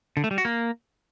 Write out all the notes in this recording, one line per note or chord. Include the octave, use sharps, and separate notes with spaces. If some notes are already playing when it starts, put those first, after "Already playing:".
D3
A3
G3
F#4
A#3